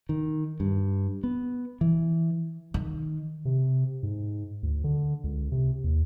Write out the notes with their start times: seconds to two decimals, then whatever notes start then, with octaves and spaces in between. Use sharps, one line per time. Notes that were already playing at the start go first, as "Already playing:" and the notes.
0.09 D#3
0.60 G2
1.24 B3
1.81 E3
2.74 D#3
3.45 C3
4.03 G#2
4.63 D2
4.84 D3
5.24 C#2
5.52 C3
5.84 D#2